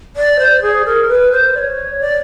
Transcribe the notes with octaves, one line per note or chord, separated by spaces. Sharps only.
D5
C5
G#4
A#4
B4
C5
D5
C#5
D5